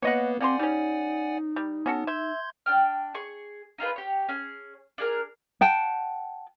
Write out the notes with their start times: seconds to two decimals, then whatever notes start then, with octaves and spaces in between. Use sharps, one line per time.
0.02 A#3 B3 B4 C#5 D#5 F#5
0.40 A#3 C4 G4 D5 F#5 G#5 C6
0.59 G3 C#4 D#4
1.56 G3
1.86 B3 C#4 F#4 A4
2.07 E5 C6 G6 G#6
2.66 D4 G5 F6
3.15 G#4 C#6
3.78 D#4 F4 G#4 B4
3.96 G4 C#5
4.29 C#4 G#4
4.98 D4 G#4 A#4
5.61 F#5 G5 A5